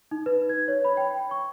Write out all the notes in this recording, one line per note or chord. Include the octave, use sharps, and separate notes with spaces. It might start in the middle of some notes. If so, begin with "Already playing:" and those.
D#4
B4
G#6
C#5
B5
G5
C#6